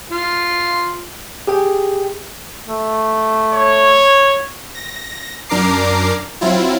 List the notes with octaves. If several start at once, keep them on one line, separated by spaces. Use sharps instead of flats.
F4
G4 G#4 G5
A3
C#5
A#6
F#2 D4 A#4 A#5 D6 C7
F#3 C4 E4 F4